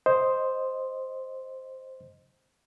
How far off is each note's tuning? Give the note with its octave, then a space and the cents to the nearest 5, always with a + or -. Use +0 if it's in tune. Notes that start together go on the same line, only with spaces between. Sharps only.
C5 +0 D#5 +0